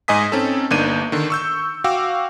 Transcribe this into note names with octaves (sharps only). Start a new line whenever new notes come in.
G#2 D#5 G#5 D#6 B6
C4 C#4 D#4 A4
G1 A#3 D4 D#4 G6 D#7
D3 D#3
C#6 E6 G6
F#4 F5 G5 D6 E6